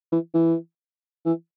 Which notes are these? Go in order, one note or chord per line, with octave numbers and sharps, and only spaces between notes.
E3
E3
E3